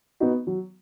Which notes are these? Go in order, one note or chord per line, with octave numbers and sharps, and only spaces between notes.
B3 D#4 F#4
F#3